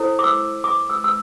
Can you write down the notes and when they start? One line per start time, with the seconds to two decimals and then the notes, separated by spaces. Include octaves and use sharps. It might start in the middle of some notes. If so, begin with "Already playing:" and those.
Already playing: E4 A4 C5
0.19 D6
0.24 E6
0.64 D6
0.90 E6
1.04 E6